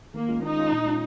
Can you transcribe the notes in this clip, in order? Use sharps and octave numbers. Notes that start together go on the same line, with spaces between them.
D#3 A#3
G#3 C#4 F4
D#3 D#4
G#3 C#4 F4
A#2
G#3 C#4 F4